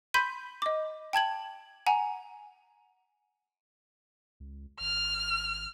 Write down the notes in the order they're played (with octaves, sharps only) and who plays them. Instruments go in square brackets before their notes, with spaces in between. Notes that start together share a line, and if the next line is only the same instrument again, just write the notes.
[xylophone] B5 C6 G6 B6 D#7
D#5 D6
G5 A5 G#6 F#7
F#5 G#5 A#5
[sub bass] C#2
[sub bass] G#1 [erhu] F6